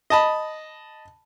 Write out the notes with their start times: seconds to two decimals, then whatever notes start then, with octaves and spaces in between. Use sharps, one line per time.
0.10 D#5 A5 B5